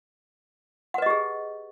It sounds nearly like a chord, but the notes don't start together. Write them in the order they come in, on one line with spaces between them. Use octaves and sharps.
F#5 B4 D#5 G4 G#4